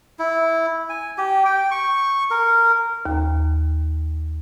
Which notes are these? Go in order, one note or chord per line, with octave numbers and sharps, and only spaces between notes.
E4
G#5
G4
G5
C#6
A#4
D#2